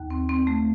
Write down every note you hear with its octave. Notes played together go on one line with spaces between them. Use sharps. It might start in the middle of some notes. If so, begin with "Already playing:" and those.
Already playing: D#2
C4
C4
A3